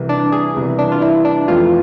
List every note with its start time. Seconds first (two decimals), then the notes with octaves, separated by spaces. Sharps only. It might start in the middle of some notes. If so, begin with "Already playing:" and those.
Already playing: C2 C3 E3
0.09 D4
0.32 G#4
0.56 C2 C3 E3
0.79 D4
0.92 F4
1.02 E4
1.25 D4
1.48 F2 E3 A3 F4